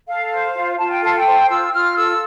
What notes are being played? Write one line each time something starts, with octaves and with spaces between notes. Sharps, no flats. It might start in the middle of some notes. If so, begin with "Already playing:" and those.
A4 F5
C5
F4
F4 A5
G5
A4 F5
G5
C5
F4 E6
F4 F6
A4 E6